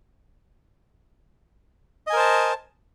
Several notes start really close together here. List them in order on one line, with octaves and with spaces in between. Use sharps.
D#5 G#5 A#4 C5 A5